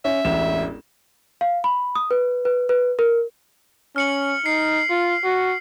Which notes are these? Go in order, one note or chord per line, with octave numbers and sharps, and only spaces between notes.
C#4 E5
E1 A1 E7
F5
B5
D#6
B4
B4
B4
A#4
C#4 F6 C#7 F#7
D#4 C7 C#7
F4
F#4